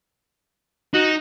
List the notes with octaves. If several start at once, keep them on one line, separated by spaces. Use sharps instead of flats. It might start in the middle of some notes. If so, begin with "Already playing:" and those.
D#4 F#4